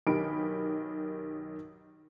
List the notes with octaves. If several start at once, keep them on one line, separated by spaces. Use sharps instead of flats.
B1 D#3 G4 B5 D7